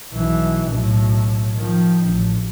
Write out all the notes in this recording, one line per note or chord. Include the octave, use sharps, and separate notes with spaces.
B1 E3
B1 A2
D#3 F3
A1